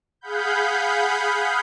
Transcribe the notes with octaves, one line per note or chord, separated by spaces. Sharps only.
G#4 F5 F#5 B5 G6